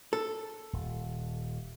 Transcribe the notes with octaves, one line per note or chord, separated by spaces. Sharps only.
A4
D#1